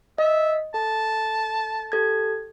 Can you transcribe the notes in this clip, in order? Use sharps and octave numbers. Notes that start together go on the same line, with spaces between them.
D#5 E5
A4 A5
G4 A4 G#6